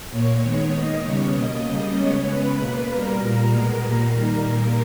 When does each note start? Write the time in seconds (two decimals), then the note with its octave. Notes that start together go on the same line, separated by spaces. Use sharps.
0.11 A#2 A#3 C#5
0.42 D#3 G#3 B3
0.73 D#3 A#3 D#5
1.04 C#3 G3 B3 C#5
1.34 B2 A#3 D#5
1.65 C#3 G3 A#3
1.96 C#3 G#3 B3 C#5
2.27 C#3 G#3 B3 B4
2.58 B2 A#3
2.88 B2 G3 A#3 A#4
3.20 A#2 G3 A#3
3.51 B2 G#3 B3
3.81 A#2 G3 A#3 A#4
4.12 D#3 G3 A#3
4.42 A#2 G3 A#3